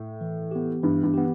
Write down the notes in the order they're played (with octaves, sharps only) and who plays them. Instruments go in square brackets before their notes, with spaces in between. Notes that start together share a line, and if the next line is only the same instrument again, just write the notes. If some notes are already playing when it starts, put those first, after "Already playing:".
Already playing: [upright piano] A2
[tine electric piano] E3
B3 G4
[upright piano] G2 [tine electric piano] E3
[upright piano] G2
[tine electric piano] B3 G4